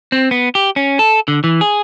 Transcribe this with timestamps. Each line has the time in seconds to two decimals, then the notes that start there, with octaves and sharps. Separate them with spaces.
0.12 C4
0.31 B3
0.55 G4
0.76 C#4
0.99 A4
1.28 D3
1.44 E3
1.61 G#4